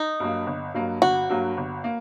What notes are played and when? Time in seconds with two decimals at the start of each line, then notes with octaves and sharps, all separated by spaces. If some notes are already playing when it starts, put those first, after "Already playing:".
Already playing: D#4
0.20 G2 F#3 A#3
0.46 G1
0.74 G2 F#3 A#3
1.02 G1 F#4
1.30 G2 F#3 A#3
1.57 G1
1.84 A#3